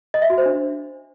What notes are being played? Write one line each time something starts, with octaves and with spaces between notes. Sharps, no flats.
D#5
E5
F#4
C5
D4